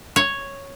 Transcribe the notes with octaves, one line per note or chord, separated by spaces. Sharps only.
C#5